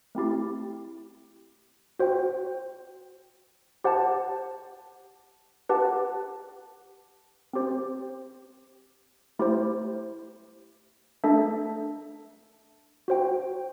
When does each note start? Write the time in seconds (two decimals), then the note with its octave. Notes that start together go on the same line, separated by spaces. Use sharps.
0.15 A3 C4 E4 G4
1.99 F#4 C5 G5
3.84 G4 C5 F#5 A5
5.69 G4 B4 F#5 A5
7.53 C4 G4 C5
9.39 A3 E4 G4 C5
11.24 A3 D4 A4 E5 A5
13.08 F#4 C5 G5